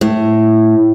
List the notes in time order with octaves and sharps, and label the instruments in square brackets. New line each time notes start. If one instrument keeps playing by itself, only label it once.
[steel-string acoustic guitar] A2